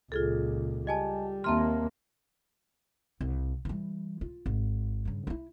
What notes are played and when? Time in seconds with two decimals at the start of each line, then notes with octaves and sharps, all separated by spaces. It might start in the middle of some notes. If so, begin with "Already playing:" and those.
0.12 C#2 A#2 F4 G#4 A4
0.87 G3 D#5 G#5 A5
1.44 D#2 A#3 C4 E5 A5 A#5 C6 F6
3.21 C2
3.65 E3 G3
4.21 F4
4.46 G#1
5.05 G2 C#3
5.27 C4 E4